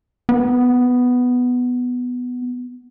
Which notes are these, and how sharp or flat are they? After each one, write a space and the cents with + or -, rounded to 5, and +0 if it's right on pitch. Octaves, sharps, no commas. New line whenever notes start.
B3 +5